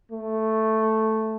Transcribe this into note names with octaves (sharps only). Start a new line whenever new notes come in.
A3